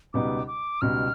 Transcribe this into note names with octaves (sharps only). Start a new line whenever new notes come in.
C#2 B2 G3 B3 D#4 D6
D6
C#2 B2 G3 B3 D#4 F6